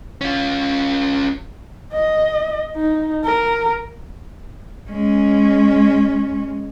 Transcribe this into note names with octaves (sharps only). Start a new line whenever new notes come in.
C#4 F4
D#5
D#4
A#4
G#3 C#4